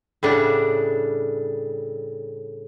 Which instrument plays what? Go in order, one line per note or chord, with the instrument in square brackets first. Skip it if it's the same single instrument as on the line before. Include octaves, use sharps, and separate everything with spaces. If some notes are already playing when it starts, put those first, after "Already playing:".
[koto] A2 C#3 G3 D4 F#5